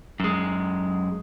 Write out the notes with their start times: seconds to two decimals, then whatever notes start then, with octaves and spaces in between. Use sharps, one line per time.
0.20 F#2 G#3